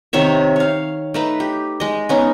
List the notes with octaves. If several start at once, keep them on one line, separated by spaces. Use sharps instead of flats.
C3 D#3 C#5 E5
C#5 F5
A3 D#4 B4
G4
G#3 D#5
B3 C#4 D#4